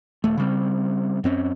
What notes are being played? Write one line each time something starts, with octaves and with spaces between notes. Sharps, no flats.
D#1 A3
C#3 G3 C4
F#2 C4 C#4